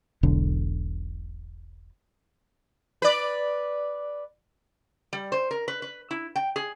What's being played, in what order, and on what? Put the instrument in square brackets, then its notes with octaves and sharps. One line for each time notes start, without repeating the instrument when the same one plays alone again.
[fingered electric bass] E1 B1 D3
[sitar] B4 D5
[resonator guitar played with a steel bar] G3
C5
A#4
B4
B4
E4
G5
G#4